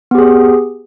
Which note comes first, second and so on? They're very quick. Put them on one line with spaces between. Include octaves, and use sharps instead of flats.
B3 G4 G#4